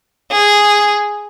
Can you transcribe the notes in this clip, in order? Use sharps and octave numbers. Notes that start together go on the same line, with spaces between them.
G#4